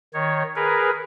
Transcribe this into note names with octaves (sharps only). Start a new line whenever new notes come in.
D#3 C#5
G#4 A#4 B4